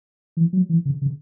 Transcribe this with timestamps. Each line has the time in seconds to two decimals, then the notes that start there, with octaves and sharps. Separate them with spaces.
0.37 E3
0.53 F#3
0.69 E3
0.85 C#3
1.02 C#3